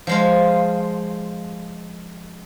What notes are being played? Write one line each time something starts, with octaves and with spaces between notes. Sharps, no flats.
F3 G#3 F4